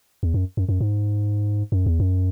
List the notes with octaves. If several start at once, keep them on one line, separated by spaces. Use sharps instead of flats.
E2
F#2
F#2
F#2
G#2
F#2
E2
F#2